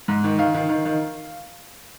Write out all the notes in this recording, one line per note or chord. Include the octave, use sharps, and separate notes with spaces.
G#2
D#3
D#3 F5
D#3
D#3
D#3